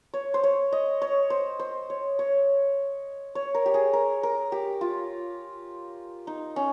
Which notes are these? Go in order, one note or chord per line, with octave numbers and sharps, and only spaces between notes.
C#5
C5
C#5
D#5
C#5
C5
C5
C#5
C#5
C#5
A#4
G4
G#4
A#4
A#4
G4
F4
D#4
C#4